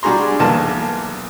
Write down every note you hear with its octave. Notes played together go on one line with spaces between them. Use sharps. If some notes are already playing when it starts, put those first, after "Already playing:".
G3 D4 F#4 G#4 A#5 C6
B1 E2 A#3 A5